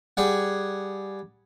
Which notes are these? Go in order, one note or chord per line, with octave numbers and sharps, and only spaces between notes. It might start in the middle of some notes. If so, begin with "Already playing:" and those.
G3 G#4 F#5